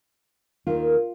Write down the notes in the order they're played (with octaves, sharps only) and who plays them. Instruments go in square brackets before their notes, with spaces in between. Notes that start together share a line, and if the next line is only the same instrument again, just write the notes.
[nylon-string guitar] D#2 D#3 F4